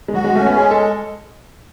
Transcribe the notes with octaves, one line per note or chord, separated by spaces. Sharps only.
G#3
F#3 F#4
G#3
A3 C#4
B3
G#3 G#4
A4